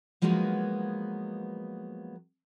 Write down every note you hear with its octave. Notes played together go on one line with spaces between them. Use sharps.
F3 F#3 G#3 A#3 B3 D#4